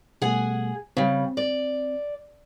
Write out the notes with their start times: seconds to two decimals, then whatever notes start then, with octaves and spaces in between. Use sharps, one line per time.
0.22 B2 G3 A3 G#4 F#5 G#5
0.97 C#3 G3 C4
1.37 D5